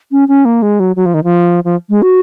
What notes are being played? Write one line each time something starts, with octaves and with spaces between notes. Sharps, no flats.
C#4
C#4
A#3
G#3
F#3
F#3
F3
D#3
F3
F3
G#3
F#4